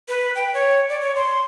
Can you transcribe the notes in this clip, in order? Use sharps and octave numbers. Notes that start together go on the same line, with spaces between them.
B4
G5
C#5
D5
C#5
C6